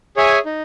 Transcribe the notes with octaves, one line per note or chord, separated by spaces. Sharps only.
G#4 C#5 E5 G#5
D#4